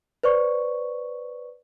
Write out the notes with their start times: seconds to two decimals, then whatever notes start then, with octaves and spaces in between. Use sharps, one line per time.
0.23 B4 C5 D5 C#6